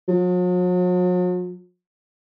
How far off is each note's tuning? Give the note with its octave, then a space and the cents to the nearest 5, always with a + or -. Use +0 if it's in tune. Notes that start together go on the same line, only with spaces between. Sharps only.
F#3 -45